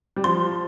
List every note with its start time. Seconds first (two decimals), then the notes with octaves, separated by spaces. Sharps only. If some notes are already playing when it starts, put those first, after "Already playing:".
0.16 G3
0.24 F3 C6